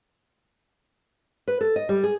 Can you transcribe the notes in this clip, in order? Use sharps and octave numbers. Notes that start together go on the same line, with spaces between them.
B4
A4
D#5
G3
G#4